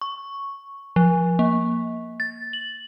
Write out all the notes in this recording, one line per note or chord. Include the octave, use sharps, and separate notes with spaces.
C#6
F3
A#3
A6
F#7